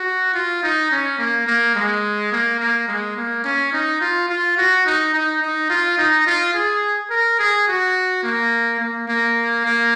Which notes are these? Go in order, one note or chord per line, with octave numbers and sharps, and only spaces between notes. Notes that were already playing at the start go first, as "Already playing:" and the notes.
Already playing: F#4
F4
D#4
C#4
A#3
A#3
G#3
A#3
A#3
G#3
A#3
C#4
D#4
F4
F4
F#4
D#4
D#4
D#4
F4
D#4
F4
G#4
A#4
G#4
F#4
A#3
A#3
A#3
A#3